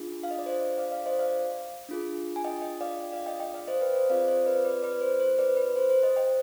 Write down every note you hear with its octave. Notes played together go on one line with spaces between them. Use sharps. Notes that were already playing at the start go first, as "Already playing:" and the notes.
Already playing: D4 F4 G#4
F5
D#5
D5
C5 D#5
D5 F5
D5 F5
C5 D#5
D5 F5
D4 F4 G#4
G#5
D#5 G5
D#5 G5
D5 F5
D5 F5
D#5 G5
D#5 G5
D5 F5
C5 D#5
B4 D5
C5 D#5
C4 F4 G#4 D5 F5
C5 D#5
B4 D5
B4 D5
B4 D5
C5
C5
B4 D5
B4
C5
C5
C5 D#5
D#5 G5